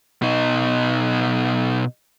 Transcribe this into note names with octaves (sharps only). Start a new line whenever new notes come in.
B2 D#4